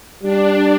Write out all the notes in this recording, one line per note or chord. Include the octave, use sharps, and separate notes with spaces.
G3 D4